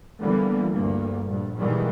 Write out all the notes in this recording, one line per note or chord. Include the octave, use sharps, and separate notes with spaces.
D3 E3 G3 A#3 B3
D2 G2 A#3
A#1 G2
B2 D#3 E3 G3 G#3